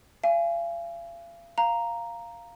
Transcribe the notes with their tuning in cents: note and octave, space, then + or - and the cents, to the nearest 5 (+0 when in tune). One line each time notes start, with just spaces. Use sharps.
F5 -40 G#5 +0
F5 -5 A#5 +0